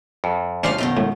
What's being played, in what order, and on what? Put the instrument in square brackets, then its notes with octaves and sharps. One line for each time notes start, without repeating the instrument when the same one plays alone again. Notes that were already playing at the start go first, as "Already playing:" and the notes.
[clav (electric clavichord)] F2
[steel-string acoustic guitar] C#3 F3 F5 [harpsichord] C#4 D4 C5
[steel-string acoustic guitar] F#2 B2 D#3
[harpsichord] A2